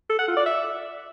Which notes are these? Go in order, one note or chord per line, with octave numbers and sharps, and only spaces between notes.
A4
F#5
F4
D5
E5